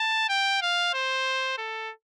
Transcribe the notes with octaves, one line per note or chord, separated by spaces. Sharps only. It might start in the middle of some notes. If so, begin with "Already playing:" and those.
Already playing: A5
G5
F5
C5
A4